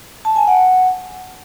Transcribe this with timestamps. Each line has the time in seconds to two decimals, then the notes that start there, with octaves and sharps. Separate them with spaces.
0.25 A5
0.36 G#5
0.47 F#5